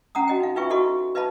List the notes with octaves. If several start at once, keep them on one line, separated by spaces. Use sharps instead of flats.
C#4 F#5 A#5 D#6
F#4 D#5 G5
D#4 F5
D#4 F4 B4 E5 G5 C#6
E4 F#4 A4 D#5 C#6
B4 D#5 F5 A5 B5